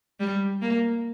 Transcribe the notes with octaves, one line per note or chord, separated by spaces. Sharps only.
G3
A#3